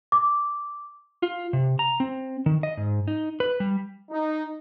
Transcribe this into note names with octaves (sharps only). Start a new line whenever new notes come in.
D6
F4
C3
A#5
C4
D#3
D#5
G#2
D#4
B4
G3
D#4